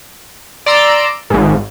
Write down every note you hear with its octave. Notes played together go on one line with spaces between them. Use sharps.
D5 A#5 C6 E6 D7
G#1 G#2